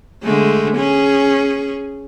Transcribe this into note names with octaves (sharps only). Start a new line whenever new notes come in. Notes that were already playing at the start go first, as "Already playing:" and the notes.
D3 G#3 A3
C#4 G#4